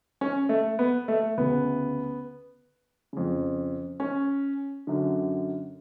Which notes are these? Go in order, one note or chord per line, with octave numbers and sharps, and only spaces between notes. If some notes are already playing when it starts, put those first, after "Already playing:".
C#4
A3
B3
A3
D2 C#3 B3
F2 C#3
C#4
F#2 D3